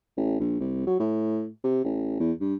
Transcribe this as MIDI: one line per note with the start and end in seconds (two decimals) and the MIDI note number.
0.17 0.37 33
0.39 0.56 34
0.60 0.85 36
0.87 0.95 54
1.00 1.48 45
1.64 1.82 48
1.84 2.18 33
2.20 2.32 40
2.40 2.54 43